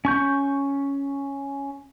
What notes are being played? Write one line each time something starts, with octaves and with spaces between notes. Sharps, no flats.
C#4 C#6 G6